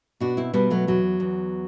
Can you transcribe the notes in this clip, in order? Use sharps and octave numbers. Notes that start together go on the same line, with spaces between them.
B2 D4 F#4
C4 E4
B2 G3 B3
F#3 A3
E2 F#3
E2